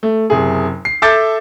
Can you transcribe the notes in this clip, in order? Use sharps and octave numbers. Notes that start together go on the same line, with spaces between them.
A3
F#1 C3 G#4
C7
A4 E5 A5 D6 G6 A6